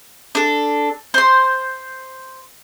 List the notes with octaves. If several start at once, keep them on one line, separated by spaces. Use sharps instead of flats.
D4 A4
C5 C6